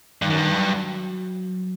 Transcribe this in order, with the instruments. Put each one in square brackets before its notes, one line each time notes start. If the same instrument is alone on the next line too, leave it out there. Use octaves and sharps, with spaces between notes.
[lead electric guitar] G2 [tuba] D#3
[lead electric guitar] F#2
G2
[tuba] F#3